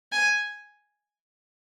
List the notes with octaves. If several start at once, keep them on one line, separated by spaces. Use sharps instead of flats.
G#5